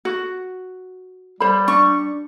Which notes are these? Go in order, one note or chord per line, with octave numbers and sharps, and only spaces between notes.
F#4
G3 C5 B5
D4 C#6